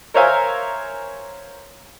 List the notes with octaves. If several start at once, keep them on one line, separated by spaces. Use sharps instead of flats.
A#4 C5 C#5 E5 F5 G#5